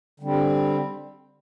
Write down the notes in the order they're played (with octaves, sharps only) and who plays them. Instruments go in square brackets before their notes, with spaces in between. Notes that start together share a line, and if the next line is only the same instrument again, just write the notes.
[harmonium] D3 G3 C4